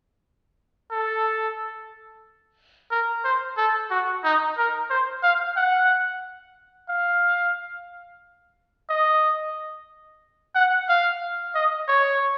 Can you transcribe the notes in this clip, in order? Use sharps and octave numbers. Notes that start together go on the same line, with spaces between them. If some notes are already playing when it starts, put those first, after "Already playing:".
A4
A#4
C5
A4
F#4
D#4
A#4
C5
F5
F#5
F5
D#5
F#5
F5
D#5
C#5